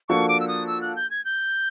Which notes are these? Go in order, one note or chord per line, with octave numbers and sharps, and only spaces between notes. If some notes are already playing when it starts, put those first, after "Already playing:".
F3 A#3 D4 F#4 A4 C#6
D6
E6
D#6
E6
F#6
G6
G#6
G6